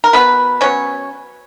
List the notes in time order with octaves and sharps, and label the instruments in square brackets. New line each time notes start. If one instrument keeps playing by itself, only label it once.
[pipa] A#4
B2 B3 B4
F#3 B3 C#4 C#5